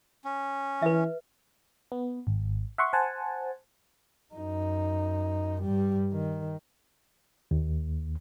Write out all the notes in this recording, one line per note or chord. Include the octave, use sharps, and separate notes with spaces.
C#4
E3 B4 E5
B3
G#1
E5 F#5 C6 C#6
C5 F#5 G#5 A5
F#2 D#4
G2 G3
D#3
D#2